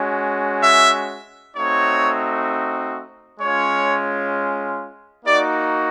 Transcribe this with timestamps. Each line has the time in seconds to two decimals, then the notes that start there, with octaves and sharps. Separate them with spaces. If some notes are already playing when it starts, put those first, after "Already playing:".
Already playing: G#3 C#4 F#4
0.63 E5
1.55 A3 C4 D#4 F#4 C#5
3.40 G#3 C#4 F4 C#5
5.25 A#3 D#4 F#4 D5